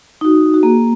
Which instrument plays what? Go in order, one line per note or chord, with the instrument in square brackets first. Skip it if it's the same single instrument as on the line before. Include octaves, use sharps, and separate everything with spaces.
[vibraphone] D#4 F#4
F#4
A#3 G#4